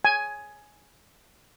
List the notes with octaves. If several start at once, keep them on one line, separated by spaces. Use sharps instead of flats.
G#5